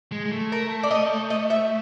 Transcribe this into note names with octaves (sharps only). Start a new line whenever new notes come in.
G#3
G#3
A3
A#4
D5
D#5
D#5
E5